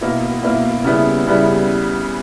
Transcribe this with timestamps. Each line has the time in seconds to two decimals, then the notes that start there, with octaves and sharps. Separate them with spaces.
0.01 B2 A#3 E4
0.43 B2 A#3 E4
0.84 C#3 G3 B3 E4
1.27 C#3 G3 B3 E4